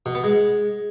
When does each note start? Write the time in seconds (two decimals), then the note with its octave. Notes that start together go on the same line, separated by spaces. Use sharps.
0.06 B2
0.15 B3
0.24 G#3